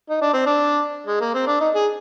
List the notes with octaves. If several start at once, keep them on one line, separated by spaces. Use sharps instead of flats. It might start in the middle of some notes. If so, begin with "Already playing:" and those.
D#4
D4
C4
D4
G#3
A#3
C4
D4
D#4
G#4